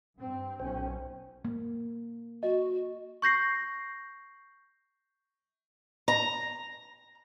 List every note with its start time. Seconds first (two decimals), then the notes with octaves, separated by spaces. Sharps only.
0.19 G2 C4
0.60 B1 A#2 C#4 C5 G5
1.45 A#3
2.43 F#4 D#5
3.22 C#6 G6 A#6 C7
6.08 A#5